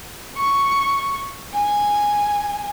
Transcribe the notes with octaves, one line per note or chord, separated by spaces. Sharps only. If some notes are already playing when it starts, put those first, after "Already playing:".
C#6
G#5